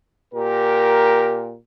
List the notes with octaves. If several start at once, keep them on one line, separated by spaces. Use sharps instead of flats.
A#2 G4 A#4